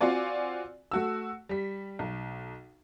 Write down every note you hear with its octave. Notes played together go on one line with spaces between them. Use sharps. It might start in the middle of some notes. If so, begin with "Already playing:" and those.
C4 F4 F#4 D5 G#5
A3 F#4 E6
G3 B6
B1